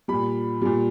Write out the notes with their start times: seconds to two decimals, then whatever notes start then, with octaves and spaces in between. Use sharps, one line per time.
0.08 A#2 G3 B5
0.62 A#2 G3